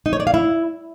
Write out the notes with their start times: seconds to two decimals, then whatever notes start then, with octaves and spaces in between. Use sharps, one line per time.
0.06 D#4
0.13 C#5
0.20 D5
0.27 F5
0.34 E4